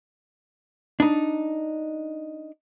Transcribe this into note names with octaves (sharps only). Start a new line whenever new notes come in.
D4 D#4